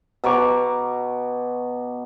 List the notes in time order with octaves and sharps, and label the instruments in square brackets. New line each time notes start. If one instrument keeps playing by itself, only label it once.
[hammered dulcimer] B2 A#5 C#6 D6